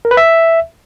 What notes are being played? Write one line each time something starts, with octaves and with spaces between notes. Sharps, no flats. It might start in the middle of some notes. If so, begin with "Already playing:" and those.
A#4
B4
E5